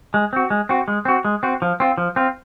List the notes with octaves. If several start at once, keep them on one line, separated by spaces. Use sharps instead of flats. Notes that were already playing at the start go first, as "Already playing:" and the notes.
G#3
C4 F#4
G#3
C4 F#4
G#3
C4 F#4
G#3
C4 F#4
F3
C4 F4
F3
C4 F4